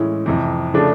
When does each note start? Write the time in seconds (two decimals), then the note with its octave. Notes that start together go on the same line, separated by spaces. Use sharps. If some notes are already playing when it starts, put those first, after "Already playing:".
Already playing: A2 E3 G#3 C#4
0.26 F2 C3 E3
0.74 C#3 F3 A3 D4